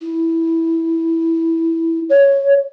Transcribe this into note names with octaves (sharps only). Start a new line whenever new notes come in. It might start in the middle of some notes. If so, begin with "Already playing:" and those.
E4
C#5